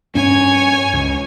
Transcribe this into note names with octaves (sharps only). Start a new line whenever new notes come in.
G2 C#4 C#5 G#5
C#2